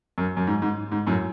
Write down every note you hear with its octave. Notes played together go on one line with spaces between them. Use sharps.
F#2
F#2
G#2
G#2
G#2
F#2 A2